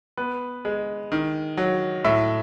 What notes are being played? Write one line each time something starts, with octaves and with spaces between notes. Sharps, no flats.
B3 B4
G#3
D#3
F#3
A2 E5